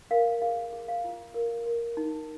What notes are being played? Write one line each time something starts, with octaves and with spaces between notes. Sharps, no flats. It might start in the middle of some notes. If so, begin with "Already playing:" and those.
A#4 F5
G#4 F5
G#4
F5
F4
A#4
A#4
D#4